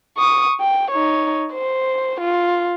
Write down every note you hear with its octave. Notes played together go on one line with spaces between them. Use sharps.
C#6 D#6
G5
D#4 C#5
C5
F4